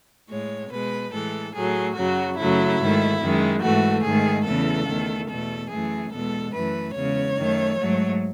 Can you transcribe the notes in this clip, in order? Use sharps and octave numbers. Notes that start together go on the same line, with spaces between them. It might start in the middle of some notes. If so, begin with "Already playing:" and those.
A2 G#3 C#5
B2 G#3 B4
A2 E3 G#3 A4
A2 F#3 A3 G#4
F#2 C#3 F#3 F#4
F#2 C#3 F#3 A3 E4
G#2 D#3 A3
F#2 D#3 G#3
G#2 E3 A3 F#4
G#2 D#3 A3 G#4
E2 C#3 E3 A3 A4
E2 D#3 A3
E2 B2 A3 A4
F#2 E3 A3 G#4
E2 B2 G#3 A4
F#2 E3 A3 B4
E2 C#3 G#3 C#5
F#2 D#3 A3
G#2 F#3 A3